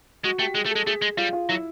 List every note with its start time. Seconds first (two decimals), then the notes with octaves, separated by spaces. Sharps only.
0.24 G#3 F#4
0.39 A3 G4
0.55 G#3 G#4
0.66 A3
0.71 G#3 A4
0.87 A3 G#4
1.02 G#3
1.17 G3 F4
1.33 F4
1.49 F#3 E4